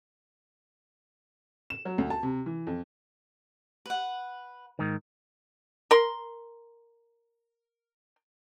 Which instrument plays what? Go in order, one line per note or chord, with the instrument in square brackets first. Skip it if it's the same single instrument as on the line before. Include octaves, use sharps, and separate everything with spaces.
[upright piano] E7
F#3
D2
A5
C3
E3
F2
[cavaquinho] B4 F#5
[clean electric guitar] G#2 D#3
[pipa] A#4 C6